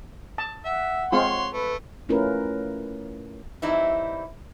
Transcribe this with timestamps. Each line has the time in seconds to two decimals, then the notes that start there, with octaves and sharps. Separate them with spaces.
0.38 A5
0.65 E5 F#5
1.12 G#3 C4 F4 C#5 C6
1.53 A3 B4
2.09 A3 C#4 E4 F4 A#4 B4
3.62 E3 G3 C4 D#4 E4